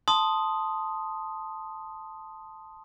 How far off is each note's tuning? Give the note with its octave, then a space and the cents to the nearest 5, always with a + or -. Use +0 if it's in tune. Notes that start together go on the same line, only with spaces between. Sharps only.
A5 +0 C6 +0 D#6 +0